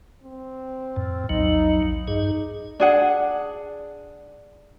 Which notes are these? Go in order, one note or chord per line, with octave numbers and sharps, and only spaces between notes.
C4
F2 A2
A#1 E2 F#3 D#4
G2 D#4 G#4
D4 G#4 F#5